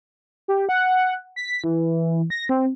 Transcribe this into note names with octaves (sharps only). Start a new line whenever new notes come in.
G4
F#5
B6
E3
A#6
C4